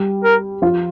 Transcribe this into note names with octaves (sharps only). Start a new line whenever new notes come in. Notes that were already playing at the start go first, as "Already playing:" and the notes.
Already playing: G3 G4
A#4
F3 F4